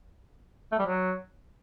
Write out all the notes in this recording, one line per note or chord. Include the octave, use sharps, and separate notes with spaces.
A3
G3
F#3